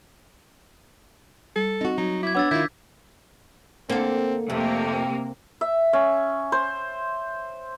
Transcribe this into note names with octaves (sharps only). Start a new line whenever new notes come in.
G3 A4
C4 D#4 F#4
F#3 D#4 F#4
E4 D6 G#6
B3 D4 C#5 F#5 D6 E6 A6
D#3 E4 F4 G6 G#6 B6
D3 A#3 C4 A4
F2 C3 A3 A#3
E5
C#4
C5